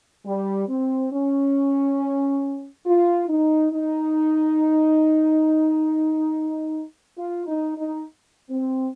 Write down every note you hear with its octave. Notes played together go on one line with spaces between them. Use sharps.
G3
C4
C#4
F4
D#4
D#4
F4
D#4
D#4
C4